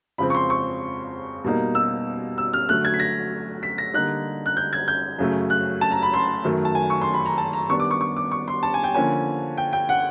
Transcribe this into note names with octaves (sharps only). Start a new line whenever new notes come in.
F2 C#3 F3 G#3 C4 B5
C#6
C6
C#6
B2 G3 A#3 D#4
E6
E6
F6
D3 F#3 A3 F#6
G#6
B6
A#6
B6
A#6
D3 G3 A#3 D#4 F#6
F#6
G6
G#6
G6
F#2 C#3 F#3 A3
F#6
A5
A#5
B5
C6
F#2 D#3 F#3 A3
A5
G#5
C#6
C6
B5
A#5
A5
A#5
D#3 G3 B3 D4 C#6
D6
C#6
C#6
D6
C#6
C6
A5
G#5
G5
D3 F3 A#3 C#4 G#5
G5
G5
F#5